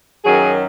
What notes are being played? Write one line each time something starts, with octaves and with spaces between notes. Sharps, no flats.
F#2 D#3 F#3 G#4